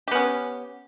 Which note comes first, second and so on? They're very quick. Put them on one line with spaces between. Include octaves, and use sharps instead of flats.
G4 B3 C#4